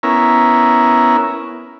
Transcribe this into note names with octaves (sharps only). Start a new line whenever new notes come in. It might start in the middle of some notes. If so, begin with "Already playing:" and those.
B3 C#4 E4 A#4